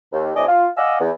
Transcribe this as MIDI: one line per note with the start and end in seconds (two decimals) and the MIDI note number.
0.12 0.30 39
0.35 0.44 45
0.35 0.44 48
0.35 0.44 62
0.35 0.44 75
0.35 0.44 80
0.35 0.44 86
0.46 0.67 65
0.76 0.95 74
0.76 0.95 75
0.76 0.95 77
0.76 0.95 78
0.76 0.95 80
0.76 0.95 88
0.99 1.10 40